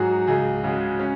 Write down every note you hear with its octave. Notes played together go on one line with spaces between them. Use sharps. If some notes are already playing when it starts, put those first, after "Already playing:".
Already playing: G#2 F#3 F#4 G#4
C#2 G#4
C#3 G#3 F#4
C#4